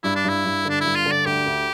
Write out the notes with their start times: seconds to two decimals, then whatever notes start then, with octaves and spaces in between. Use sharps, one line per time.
0.04 G2 E4
0.16 D4
0.24 G2 E4
0.45 G2
0.65 D3 D4
0.81 G2 E4
0.95 F4
1.05 D3
1.11 D5
1.26 D2 G4
1.46 D2